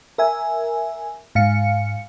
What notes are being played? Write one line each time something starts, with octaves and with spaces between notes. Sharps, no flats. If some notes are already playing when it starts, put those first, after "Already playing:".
A#4 E5 G#5
G#2 F5 C#7